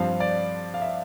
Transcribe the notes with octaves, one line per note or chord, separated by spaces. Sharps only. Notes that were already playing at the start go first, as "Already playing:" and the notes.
Already playing: G2 F3 C4 F5
D5
F5
E5